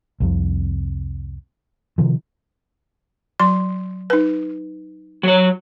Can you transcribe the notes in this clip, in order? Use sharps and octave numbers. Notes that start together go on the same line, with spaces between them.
C2 F2 C3
C3 D#3 F3
F#3 C6
D#4 B4
F#3 C#5